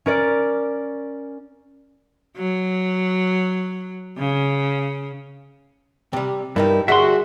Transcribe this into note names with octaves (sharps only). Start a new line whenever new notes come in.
C#4 A#4 D5
F#3
C#3
C3 G3
G2 G3 D#4 E4 A#4
D2 G3 F#4 G#4 E5 C6